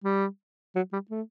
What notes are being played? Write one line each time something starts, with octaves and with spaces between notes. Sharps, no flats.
G3
F#3
G3
A3